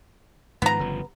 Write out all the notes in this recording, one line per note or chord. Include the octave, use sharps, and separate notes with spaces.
G#2 D#3 F3 B3 A#5
G1 C#3 F3